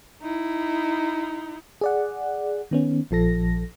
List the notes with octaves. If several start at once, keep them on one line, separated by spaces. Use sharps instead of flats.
D#4 E4
G#4 D5 F#5
D#3 B3 C#4
A#1 F3 A4 A#6